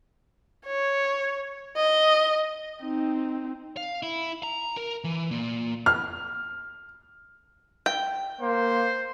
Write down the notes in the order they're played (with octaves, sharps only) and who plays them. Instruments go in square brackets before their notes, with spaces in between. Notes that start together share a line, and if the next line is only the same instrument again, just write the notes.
[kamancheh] C#5
D#5
[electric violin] C4 D#4
[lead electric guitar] F5
E4
A#5
A#4
E3
A#2
[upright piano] F6
[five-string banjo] G5
[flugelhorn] A#3 [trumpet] C5